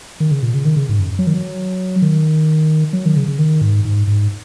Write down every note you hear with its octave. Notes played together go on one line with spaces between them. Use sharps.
D#3
C#3
A#2
C#3
D#3
C#3
G#2
F#2
F#3
D#3
F#3
D#3
F#3
D#3
C#3
C#3
D#3
G#2
G#2
G#2